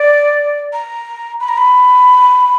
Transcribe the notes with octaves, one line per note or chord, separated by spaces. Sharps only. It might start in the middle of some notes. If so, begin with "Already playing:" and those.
Already playing: D5
A#5
B5
A#5
B5